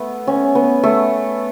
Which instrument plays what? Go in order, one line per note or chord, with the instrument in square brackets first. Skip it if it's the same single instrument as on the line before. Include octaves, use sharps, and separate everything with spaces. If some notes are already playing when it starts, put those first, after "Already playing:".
Already playing: [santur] A3 B3
C#4
B3
A3